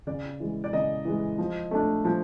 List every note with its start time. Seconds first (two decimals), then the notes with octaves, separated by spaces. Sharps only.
0.07 C#3 D5
0.40 E3 G#3
0.64 D5
0.73 C#3 D#5
1.05 E3 G#3
1.38 F3
1.71 A3 D4
2.05 F3